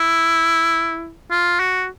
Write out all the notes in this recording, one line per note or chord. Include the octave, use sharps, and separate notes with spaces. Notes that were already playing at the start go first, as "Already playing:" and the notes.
Already playing: E4
F4
F#4